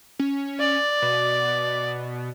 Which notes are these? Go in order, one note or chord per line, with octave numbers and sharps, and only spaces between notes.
C#4
D5
B2